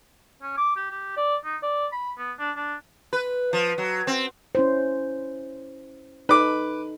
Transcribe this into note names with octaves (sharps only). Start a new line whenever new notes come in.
C#4
D6
G4
G4
D5
D#4
D5
B5
B3
D4
D4
B4
F3
F#3
C4
C#4 E4 C5
D#4 A4 B4 D6